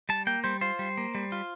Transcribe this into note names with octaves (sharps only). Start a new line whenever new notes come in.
G3 A5
A#3 G5
G3 C5
F4 C5
G3
A#3
G3
F4